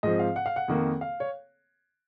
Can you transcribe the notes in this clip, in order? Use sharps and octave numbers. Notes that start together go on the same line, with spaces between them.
G#2 F3 C4 D#5
F5
F#5
F5
F#5
F2 D#3 A#3
F5
C#5